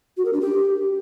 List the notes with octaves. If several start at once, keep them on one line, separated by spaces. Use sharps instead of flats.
F#4
A#4
D4
G4